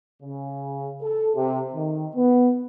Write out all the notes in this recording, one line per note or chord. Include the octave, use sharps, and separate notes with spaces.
C#3
A4
C3
D#3
B3